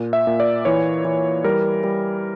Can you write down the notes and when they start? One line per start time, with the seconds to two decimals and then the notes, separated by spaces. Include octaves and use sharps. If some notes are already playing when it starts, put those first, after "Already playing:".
Already playing: A#2
0.13 E5
0.27 A#2
0.40 D5
0.65 E3 C#5
1.05 E3
1.44 G3 A#4
1.84 G3